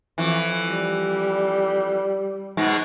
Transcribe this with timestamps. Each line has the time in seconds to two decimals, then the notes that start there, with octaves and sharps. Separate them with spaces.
0.18 F2 E3
0.65 G3
2.57 G#2 B2 G#3